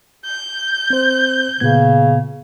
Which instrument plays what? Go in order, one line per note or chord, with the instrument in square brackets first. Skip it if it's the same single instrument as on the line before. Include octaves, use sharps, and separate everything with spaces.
[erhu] G6
[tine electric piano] C4 C5
[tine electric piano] A#2 B3 G#6 [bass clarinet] C#3